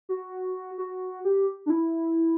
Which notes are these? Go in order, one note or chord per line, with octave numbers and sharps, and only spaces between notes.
F#4
F#4
G4
D4
E4